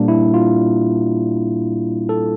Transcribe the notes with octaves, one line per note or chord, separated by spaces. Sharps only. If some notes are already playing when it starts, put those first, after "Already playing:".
Already playing: A#2 G3 A#3 D4
E4
F4
A4